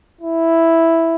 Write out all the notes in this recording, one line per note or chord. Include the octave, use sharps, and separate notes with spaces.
E4